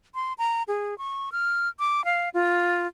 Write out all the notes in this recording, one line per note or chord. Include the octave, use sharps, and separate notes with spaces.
C6
A#5
G#4
C#6
F6
D6
F5
F4